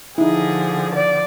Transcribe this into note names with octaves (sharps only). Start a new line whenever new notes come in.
D3 F3 D#4 E4 G#4
D5